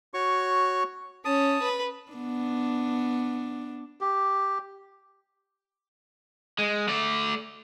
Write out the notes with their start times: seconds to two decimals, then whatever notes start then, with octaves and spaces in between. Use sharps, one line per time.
0.14 F#4 C#5 C#6
1.25 C#4 A5 D#6
1.62 B4
2.12 B3 D4
4.01 G4
6.59 G#3
6.88 A3 D5